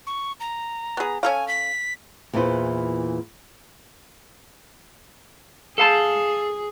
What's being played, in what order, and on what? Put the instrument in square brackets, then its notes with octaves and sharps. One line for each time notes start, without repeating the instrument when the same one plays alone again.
[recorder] C#6
A#5
[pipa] B3 G#4
[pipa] C#4 A4 F5 [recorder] G#5
[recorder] B6
[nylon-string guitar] E2 A#2 E3 D4 B4 C5
[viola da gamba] G#4 [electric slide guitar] A4 F5 A5